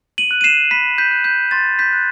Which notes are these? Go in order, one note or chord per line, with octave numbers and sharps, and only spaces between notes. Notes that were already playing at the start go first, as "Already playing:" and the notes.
D#7 F#7
F#6
D#7
C7 E7
B5 B6 D#7
G6 B6
F#6
G6
C6 A6
G6 B6
F#6